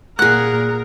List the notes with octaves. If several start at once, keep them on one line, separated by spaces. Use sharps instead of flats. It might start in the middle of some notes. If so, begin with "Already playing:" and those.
A#2 G#4 A#4 F#5 F#6